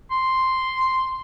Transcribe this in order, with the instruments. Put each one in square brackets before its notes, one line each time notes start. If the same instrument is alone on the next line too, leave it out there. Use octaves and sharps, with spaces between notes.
[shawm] C6